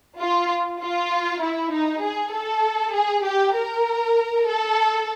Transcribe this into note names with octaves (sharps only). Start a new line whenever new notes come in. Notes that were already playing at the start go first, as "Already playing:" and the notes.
F4
F4
E4
D#4
G#4
A4
G#4
G4
A#4
A4